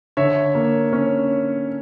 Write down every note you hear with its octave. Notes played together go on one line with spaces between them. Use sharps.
D3 C#5 E5
A#3
C#4